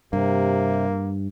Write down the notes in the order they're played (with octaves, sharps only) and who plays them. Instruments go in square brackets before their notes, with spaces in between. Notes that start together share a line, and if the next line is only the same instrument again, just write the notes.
[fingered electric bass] G2 [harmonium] C3 [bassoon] A#3